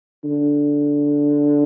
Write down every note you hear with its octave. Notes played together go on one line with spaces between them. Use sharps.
D3